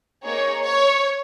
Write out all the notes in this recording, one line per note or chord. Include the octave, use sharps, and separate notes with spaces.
A#3 D#4 G#4 C#5
C#5